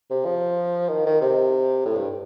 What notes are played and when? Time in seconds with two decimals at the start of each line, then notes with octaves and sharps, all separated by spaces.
0.10 C3
0.25 F3
0.89 D#3
1.06 D#3
1.21 C3
1.86 A2
1.96 G2